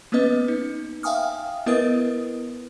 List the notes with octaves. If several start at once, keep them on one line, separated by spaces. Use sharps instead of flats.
A#3 B3 C#4 B4 D#5
D#4
E5 F5 G5 G#5 D#6 F6
B3 E4 A#4 B4 D#5 D#6